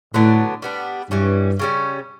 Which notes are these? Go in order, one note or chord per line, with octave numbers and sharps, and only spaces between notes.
A2 D3 F#3 B3 D4
G3 B3 D4
G2 E3 G3 C#4
C#3 G3 C#4